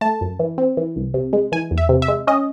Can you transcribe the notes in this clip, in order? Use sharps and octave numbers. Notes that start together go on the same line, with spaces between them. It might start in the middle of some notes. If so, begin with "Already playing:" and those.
A3 A5
F#2
E3
C4
E3
C2
C3
G#3
E3 G#5
E2
E5
C3
E5
G#3
C#4 D#5